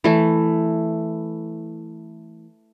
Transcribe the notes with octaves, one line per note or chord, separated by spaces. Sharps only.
E3 A3